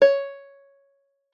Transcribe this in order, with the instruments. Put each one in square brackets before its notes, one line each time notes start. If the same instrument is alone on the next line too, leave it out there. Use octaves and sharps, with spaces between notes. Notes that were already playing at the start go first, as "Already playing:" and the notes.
[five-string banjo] C#5